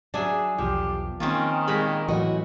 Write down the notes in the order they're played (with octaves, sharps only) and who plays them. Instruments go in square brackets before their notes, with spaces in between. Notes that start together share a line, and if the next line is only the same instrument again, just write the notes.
[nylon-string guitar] F#3 D5 E5 [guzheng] D4 G#4
[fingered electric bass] B1 E2 [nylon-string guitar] F3 [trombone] G4
[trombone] D#3 [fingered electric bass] A#3 [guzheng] C4 C#4 F4
[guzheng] A#2 B5 [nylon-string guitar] G#3 G#4
[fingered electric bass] A2 E3 F#3 [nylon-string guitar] E4 F#4 D#5